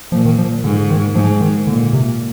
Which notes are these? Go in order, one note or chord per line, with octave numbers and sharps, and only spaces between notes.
A#2 F3
D#3
F3
G#2 D3
D#3
G#2 F3
D#3
A#2 D3
C3